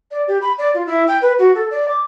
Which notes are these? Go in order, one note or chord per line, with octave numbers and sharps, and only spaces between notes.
D5
G4
B5
D5
F4
E4
G5
B4
F#4
A4
D5
D6